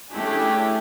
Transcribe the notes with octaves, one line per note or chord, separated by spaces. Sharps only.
A3 C#4 D4 E4 G4 G#4